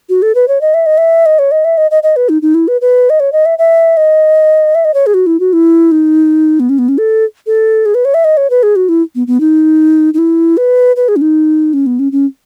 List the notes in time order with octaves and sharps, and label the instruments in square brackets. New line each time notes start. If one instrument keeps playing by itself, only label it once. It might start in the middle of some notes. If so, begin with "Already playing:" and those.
[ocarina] F#4
A4
B4
C#5
D#5
E5
D#5
E5
D#5
C#5
D#5
E5
D#5
D#5
D#5
B4
D#4
D#4
E4
B4
B4
D#5
C#5
D#5
E5
E5
D#5
E5
D#5
C#5
G#4
F#4
E4
F#4
E4
D#4
B3
C#4
B3
C#4
A4
A4
G#4
B4
C#5
E5
D#5
C#5
B4
G#4
F#4
E4
B3
B3
D#4
D#4
E4
B4
B4
G#4
C#4
D#4
C#4
B3
C#4
C#4